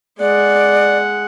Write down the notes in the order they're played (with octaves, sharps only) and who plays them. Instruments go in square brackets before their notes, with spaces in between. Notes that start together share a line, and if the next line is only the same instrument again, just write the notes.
[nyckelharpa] G#3 F#5 [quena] D5